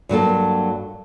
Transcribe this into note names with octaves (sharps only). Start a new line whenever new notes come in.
G2 F#3 A#3 A4